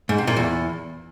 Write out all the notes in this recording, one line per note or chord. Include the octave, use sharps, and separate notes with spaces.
G#2
C3
A#2
E2